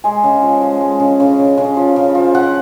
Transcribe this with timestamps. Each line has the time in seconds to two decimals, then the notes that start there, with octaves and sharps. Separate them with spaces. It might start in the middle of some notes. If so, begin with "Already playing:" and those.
0.04 G#3 G#5
0.24 C#3
0.42 F3
0.62 G#3
0.81 G#3
1.00 C#3
1.20 C#3
1.39 C#3
1.58 C#3
1.77 F3
1.96 C#3
2.15 F3
2.35 F3 F#5